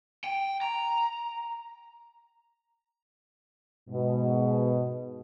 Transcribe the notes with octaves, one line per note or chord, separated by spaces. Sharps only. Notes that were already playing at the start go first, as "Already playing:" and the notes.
G5
A#5
G#2 B2